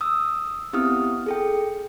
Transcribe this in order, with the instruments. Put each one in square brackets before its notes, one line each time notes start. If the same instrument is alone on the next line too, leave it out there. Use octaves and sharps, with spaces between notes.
[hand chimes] D#6 E6
B3 C4 E4 G4 D#6 F6
G#4 A4 G5